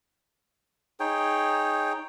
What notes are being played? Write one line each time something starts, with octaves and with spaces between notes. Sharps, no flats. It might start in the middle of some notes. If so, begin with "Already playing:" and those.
D#4 G#4 C#5 G5